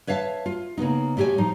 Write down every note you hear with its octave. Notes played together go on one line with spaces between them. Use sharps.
B4 C#5 E5 F5 A5
F4
C#3 A#3 B3 D#4
A2 A3 G4 B4 C#5 G#5
F3 D#4